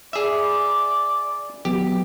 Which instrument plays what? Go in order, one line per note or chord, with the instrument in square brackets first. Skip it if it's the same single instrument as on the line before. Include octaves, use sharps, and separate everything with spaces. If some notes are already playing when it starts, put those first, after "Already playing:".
[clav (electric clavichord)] G#4 E5 [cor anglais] D5 [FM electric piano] B5
[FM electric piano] F#3 B3 [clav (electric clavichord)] G4